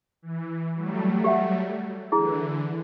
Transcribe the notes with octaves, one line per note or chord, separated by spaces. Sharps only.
E3
F#3 G3 A3
G4 E5 F#5
D3 E3 E4 G#4